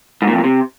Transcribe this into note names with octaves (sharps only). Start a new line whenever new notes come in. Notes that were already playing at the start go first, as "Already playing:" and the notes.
G#2
A#2
F2
A#2
C3